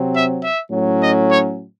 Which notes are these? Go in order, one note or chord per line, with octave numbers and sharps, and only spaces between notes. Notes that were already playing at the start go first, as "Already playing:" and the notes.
Already playing: C3 F#3 C4
E5
E5
A2 F#3 C#4
D#5
C#5